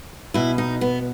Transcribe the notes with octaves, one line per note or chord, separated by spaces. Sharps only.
B2 E4
D#4
B3